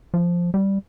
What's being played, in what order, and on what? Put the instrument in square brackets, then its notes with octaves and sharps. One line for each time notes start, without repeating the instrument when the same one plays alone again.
[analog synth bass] F3
G3